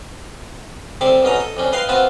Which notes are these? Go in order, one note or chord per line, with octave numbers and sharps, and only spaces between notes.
C3 G3 C4 A4 E5 D6
B1 B2 C#4 D#5 A#5
A4 D#5
F2 G3 C#4
B4 D#5 F5 G5 C6
B3 C4 F4 F#4 B4 A5